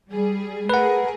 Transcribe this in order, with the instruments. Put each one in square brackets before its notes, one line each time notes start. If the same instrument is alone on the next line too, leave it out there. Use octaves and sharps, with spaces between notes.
[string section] G3 G#4
[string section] A3 G#4 A#4 [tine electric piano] B4 F#5